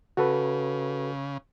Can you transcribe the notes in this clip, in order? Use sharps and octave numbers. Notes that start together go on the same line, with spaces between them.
C#3 F#4 A4 B4